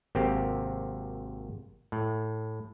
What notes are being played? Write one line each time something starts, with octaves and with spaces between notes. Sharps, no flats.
G#1 C3 A#3 C4 G4
A2